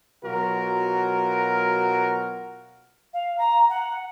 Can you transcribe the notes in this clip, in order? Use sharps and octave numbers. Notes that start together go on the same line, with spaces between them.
B2 F#3 F4 F#4 A#4
F5
A#5
F#5